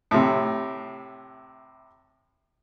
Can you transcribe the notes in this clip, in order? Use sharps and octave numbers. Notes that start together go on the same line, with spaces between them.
A2 C3